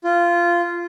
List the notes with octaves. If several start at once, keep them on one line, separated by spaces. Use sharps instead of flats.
F4